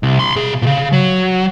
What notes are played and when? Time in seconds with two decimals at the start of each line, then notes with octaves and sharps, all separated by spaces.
0.03 C2
0.19 B5 C6
0.36 B2 G#4
0.62 A#2 C#3
0.93 F#3